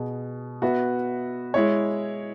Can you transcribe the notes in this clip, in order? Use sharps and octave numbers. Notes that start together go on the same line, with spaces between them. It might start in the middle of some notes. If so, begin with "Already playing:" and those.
Already playing: B2 B3 G#4
B3 F#4 B4 E5
G#3 E4 C#5